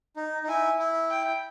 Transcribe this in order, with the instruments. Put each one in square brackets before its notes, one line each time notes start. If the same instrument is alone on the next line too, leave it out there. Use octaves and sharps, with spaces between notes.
[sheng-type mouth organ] D#4
D#4
[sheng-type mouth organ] E4 [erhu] G#5
[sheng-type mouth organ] E4
[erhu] G5